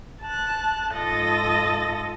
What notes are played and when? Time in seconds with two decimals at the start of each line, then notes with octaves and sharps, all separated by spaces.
0.23 A5 F#6
0.93 G#2 F4 A4 D#5 A6 A#6